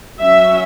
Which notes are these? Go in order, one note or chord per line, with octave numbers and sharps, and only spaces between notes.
F#3 C#4 E5